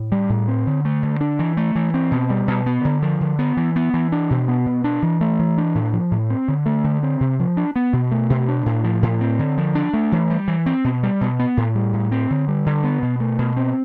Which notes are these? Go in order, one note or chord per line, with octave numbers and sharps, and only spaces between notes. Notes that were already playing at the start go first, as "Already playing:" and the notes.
Already playing: A2
G3
A2
C4
D3
A3
D3
D4
E3
A3
E3
C4
B2
G3
B2
B3
D3
F3
D3
B3
E3
B3
E3
D4
B2
B3
B2
D4
E3
A3
E3
D4
A2
F3
A2
C4
D3
A3
D3
C4
C3
F3
D4
B3
B2
A3
B2
D4
A2
F3
A2
C4
D3
F3
D4
A3
E3
G3
E3
C4
B2
G3
B2
B3
A2
G3
A2
C4
D3
G3
D3
B3
B2
A3
B2
C4